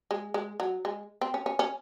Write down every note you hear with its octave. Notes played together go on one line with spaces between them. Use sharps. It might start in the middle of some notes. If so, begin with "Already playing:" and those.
G#3
G#3
F#3
G#3
C4
C#4
C#4
C#4